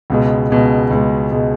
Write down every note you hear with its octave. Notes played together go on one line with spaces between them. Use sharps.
C#2 B2 G#3
C#2 B2 G#3
C#2 B2 G#3
B2 G#3